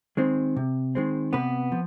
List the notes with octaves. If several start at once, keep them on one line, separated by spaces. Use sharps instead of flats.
D#3 G#3 C4
C3
D#3 G#3 C4
C3 B3 B4
F3